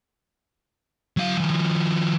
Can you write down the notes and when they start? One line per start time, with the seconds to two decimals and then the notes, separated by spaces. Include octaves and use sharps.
1.17 F#3 F5
1.38 D#3 F3